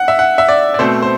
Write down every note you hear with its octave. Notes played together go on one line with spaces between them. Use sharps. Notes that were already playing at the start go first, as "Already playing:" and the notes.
Already playing: F#5
E5
F#5
E5
D5
D5
B2 A3 C4 C5
C5